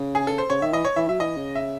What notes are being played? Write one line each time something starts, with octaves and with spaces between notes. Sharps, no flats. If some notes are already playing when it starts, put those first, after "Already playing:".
Already playing: C#3
G#4
A4
C5
C#3 C#5
D#3 E5
E3 D#5
C#5
E3 E5
F#3 E5
E3 D#5
C#3
E5